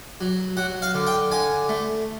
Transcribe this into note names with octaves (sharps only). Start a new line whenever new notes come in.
F#3
F#3 F#5
F5
D3
G5
D3 G#5
A3